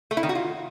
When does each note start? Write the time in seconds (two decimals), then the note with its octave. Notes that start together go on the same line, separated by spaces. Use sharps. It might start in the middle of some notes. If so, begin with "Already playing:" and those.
0.11 A3
0.17 E4
0.23 D#3
0.29 F#4
0.35 F4